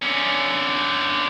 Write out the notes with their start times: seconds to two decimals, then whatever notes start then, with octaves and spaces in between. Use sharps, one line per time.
0.02 D3 C#4